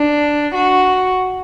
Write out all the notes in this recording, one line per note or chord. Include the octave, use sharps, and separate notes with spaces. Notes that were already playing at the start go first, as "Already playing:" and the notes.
Already playing: D4
F#4